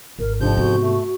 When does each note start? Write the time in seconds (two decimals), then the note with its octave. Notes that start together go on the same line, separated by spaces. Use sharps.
0.19 G#1 A#4
0.41 F2 G#2 C3 F3 D4 G6
0.57 B3 F#4
0.82 A3